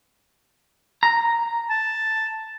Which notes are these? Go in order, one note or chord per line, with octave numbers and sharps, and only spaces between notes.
A#5
A5